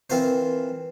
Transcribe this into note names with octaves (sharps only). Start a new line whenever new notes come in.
E3 C4 F4 A#4 C5